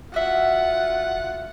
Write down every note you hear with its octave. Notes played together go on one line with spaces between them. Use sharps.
F4 F#4 E5 F#5